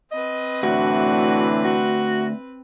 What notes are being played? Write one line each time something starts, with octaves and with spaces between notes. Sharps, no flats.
C4 B4 D#5
D2 A2 E3 D4 F#4
F#4